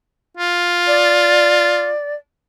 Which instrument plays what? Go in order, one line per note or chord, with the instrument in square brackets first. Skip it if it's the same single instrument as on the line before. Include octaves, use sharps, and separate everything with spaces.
[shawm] F4
[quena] D5